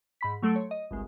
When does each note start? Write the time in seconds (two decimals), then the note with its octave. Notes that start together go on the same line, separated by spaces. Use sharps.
0.21 G#2 B5 B6
0.42 F#3 A3 A4 C6 D7
0.56 C#5
0.71 D#5
0.91 G1 C2 G#3